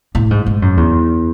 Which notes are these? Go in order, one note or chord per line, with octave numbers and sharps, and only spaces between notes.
A2
G#2
G#2
F#2
E2